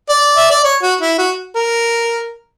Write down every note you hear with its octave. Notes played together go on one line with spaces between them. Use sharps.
D5
E5
D5
C#5
F#4
E4
F#4
A#4